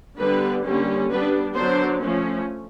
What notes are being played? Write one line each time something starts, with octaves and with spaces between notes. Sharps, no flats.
D3 G3 B3 D4 B4
D3 G3 A#3 C#4
G3 B3 D4 B4
D3 F#3 B3 D4 C5
F3 A3 C#4